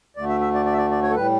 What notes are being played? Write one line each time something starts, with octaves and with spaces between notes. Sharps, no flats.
D2 D3 A3 D5
E5
E5
D5
D5
E5
D5
D5
C#5
A4
A2 G3 B4